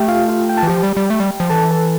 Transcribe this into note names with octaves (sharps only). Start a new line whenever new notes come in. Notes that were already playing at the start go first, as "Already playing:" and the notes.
Already playing: A3 G4 G5
F4 F5
F4 F5
G5
A5
E3
F3 G4 G5
G3
G3
A3
G3
F3
E3 A4 A5
A4 A5